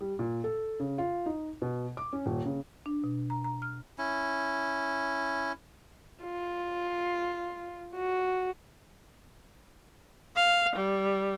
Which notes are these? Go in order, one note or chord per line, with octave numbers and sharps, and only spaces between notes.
G3
A#2
A4
C#3
F4
D#4
B2
D6
C#4
D#1
C#3
D4
B2
A#5
A#5
F6
C#4 E4
F4
F#4
F5
G3